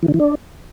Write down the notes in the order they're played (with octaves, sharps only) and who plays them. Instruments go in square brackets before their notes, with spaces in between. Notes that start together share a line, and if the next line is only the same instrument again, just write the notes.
[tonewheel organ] E3
D3
E3
D4